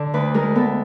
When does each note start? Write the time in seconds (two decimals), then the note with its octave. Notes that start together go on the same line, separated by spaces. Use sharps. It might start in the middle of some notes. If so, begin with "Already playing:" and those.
Already playing: D3
0.14 D2 B4
0.34 G#3 A#4
0.55 B3 A4